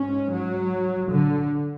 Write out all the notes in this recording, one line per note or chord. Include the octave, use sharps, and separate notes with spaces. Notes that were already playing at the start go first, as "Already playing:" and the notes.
Already playing: G#2 C#4
F#3
D3